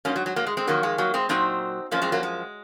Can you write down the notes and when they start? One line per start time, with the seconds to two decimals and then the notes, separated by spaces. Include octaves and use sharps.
0.05 G#2 F#3 A#3 C#4
0.16 F#3
0.26 F#3
0.36 F#3 A#3
0.47 G#3
0.57 G#3 C4
0.67 F2 D#3 F#3 A#3
0.83 G#3
0.98 F#3 A#3
1.14 G#3 C4
1.29 A#2 F#3 C4 D#4
1.91 F#2 F3 A#3 C#4
2.02 G#3 C4
2.12 F#3 A#3
2.23 G#3